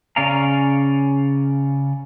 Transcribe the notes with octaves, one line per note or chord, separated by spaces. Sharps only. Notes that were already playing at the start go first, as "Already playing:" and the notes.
C#3 C#4 D5 F5 A#5